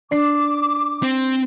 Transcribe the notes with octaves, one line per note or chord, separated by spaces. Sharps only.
D4 D6 C7
C4